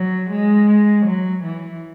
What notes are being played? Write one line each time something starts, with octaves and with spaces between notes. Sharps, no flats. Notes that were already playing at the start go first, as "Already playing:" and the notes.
Already playing: F#3
G#3
F#3
E3